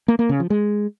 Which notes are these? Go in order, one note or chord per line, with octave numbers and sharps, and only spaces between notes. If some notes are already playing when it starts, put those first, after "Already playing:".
A#3
A#3
C#3
F3
G#3